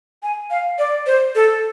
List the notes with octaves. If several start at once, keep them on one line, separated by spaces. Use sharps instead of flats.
G#5
F5
D5
C5
A4